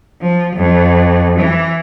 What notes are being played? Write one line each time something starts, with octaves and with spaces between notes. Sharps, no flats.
F3
F2
E3